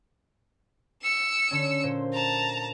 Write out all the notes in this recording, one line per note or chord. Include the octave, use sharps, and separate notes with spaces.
E6 C#7
D3 C#4
A#2 C5
A5 A#5